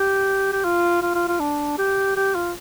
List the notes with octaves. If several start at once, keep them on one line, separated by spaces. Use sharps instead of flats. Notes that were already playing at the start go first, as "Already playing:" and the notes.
Already playing: G4
G4
F4
F4
F4
F4
D4
G4
G4
F4